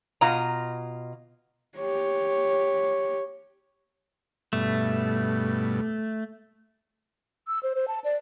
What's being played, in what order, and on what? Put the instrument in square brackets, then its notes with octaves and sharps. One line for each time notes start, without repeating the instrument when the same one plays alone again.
[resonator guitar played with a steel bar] B2 F4 D#5 A#5
[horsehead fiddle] G4 C#5
[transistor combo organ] G2 B2 [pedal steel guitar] A3
[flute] E6
C5
C5
A5
D5